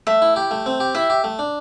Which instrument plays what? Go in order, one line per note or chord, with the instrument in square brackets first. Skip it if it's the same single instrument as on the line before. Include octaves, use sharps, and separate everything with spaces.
[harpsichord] A3 [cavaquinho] E5
[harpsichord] E4
G4
A3
C4
G4
[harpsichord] E4 [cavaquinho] E5
[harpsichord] G4
A3
D4